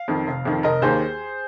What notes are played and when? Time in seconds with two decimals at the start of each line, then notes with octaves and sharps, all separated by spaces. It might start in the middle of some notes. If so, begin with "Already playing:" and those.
Already playing: F5
0.08 F2 D#3
0.27 F1
0.45 F2 D#3
0.63 F1 A#4 D#5
0.82 D#2 D#3 A#3 G#4 C5